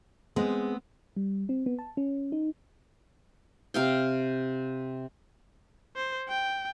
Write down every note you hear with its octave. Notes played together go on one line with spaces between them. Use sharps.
G#3 B3 C4
G3
C4
B3
A5
C#4
D#4
C3 F5 G5
C5
G5